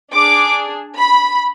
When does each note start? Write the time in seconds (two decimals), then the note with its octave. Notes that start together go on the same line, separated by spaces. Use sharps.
0.12 D4 G#4 D6
0.97 B5